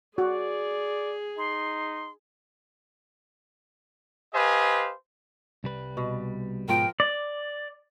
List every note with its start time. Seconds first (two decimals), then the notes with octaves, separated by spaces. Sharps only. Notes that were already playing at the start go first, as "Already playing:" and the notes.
0.18 F#4 G#4 D5
1.38 D#4 C6
4.34 G4 B4 C5 D#5 F5 G#5
5.64 C2 G3 B4
5.97 B2
6.68 G#2 B2 F3 G#3 F4 A#4 G5
7.00 D5